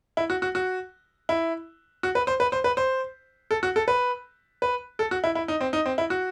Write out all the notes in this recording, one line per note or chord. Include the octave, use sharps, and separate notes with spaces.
E4
F#4
F#4
F#4
E4
F#4
B4
C5
B4
C5
B4
C5
A4
F#4
A4
B4
B4
A4
F#4
E4
E4
D#4
C4
D#4
C4
E4
F#4